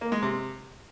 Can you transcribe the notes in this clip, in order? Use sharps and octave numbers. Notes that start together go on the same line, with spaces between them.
A#3
G#3
C3